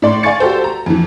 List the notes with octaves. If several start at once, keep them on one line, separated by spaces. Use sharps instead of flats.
A2 D5 C6
D5 F5 G#5 C#6 A6 C#7
F#4 G4 A4 C5
A#5
F2 E3